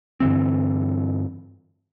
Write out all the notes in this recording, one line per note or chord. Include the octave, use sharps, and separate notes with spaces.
G2 D3 E3 C4